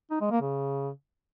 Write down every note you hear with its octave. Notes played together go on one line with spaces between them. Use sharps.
D#4
G#3
A#3
C#3